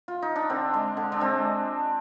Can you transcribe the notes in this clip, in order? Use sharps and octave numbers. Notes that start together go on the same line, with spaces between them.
F4
D#4
D4
D3 C4
G#3
D3
D4
G#3 C4